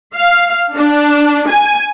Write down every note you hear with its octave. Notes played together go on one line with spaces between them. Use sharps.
F5
D4
G#5